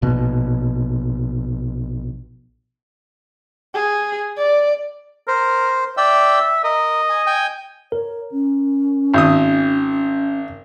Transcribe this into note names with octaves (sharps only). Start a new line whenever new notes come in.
A#1 B2
G#4
D5
A#4 C5
D5 E5 G5 E6
A#4 D#5
G#5
G5 G#5
A#4 C#5
C#4
G#1 D#6